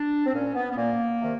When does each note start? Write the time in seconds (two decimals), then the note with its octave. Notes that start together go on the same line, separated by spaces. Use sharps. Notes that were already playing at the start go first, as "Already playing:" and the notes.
Already playing: D4
0.26 C4
0.34 A#2 C#4
0.55 B3
0.72 B3
0.77 A#2 A#3
1.20 C3 D#3